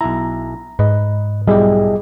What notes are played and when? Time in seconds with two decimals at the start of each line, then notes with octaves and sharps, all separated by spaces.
0.01 B1 E4 A#5
0.79 G#2 B4 D#5
1.47 B1 G3 E4 G4 G#4 D#5